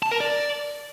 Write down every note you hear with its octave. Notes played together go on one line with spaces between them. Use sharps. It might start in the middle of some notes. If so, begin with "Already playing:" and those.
A5
A#4
D5